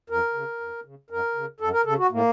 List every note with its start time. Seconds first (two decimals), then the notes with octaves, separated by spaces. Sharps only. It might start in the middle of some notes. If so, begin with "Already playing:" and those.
0.10 F2 A#4
0.34 C#3
0.60 F2
0.85 C#3
1.10 F#2 A#4
1.35 C#3
1.60 F#2 A4
1.73 A#4
1.85 C#3 A4
1.98 F#4
2.11 A2 A#3